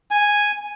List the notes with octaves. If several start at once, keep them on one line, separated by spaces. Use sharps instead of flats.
G#5